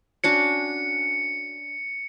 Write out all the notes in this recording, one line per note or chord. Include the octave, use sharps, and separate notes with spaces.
C#4 D4 F#4 C#7